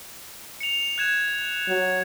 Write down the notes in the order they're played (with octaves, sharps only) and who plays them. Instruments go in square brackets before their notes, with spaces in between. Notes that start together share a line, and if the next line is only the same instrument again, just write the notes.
[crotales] C#7 F7
F#6 G#6 E7
[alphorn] F#3